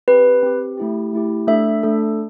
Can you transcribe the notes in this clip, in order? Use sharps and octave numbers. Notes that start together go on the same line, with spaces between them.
C4 G4 B4
C4 G4
A3 E4 G4
A3 E4 G4
A3 D4 A4 E5
A3 D4 A4